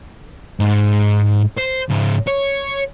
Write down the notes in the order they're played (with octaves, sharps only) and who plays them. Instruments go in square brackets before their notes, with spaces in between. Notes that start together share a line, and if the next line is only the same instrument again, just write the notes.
[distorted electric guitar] G#2
C5
C#2 G#2
C#5